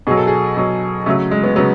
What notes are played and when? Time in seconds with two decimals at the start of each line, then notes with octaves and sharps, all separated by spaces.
0.07 B2 F#3 G#4
0.17 A4
0.27 G#4
0.57 B2 F#3
1.06 C#3 F#3 A3
1.31 G#3
1.44 B3
1.56 C#3 F#3 B3